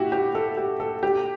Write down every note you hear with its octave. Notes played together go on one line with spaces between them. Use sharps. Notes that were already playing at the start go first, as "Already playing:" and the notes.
Already playing: E4 F#4 G4
G4
A4
G4
A4
G4